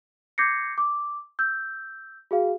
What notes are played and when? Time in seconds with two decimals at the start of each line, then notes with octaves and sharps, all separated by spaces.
0.38 D6 G6 G#6 A#6 C7 C#7
0.78 D6
1.39 E6 G6
2.31 F#4 G#4 F5